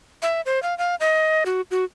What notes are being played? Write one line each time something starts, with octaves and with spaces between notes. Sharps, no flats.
E5
C5
F5
F5
D#5
F#4
F#4